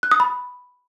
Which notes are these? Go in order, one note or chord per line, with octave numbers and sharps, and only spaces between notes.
F#6
D#6
B5